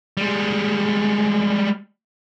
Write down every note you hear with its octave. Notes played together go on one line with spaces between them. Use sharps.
G3 G#3